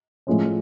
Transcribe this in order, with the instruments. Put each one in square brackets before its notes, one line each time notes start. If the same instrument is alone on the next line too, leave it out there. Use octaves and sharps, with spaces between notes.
[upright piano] A2 F3 G#3 C#4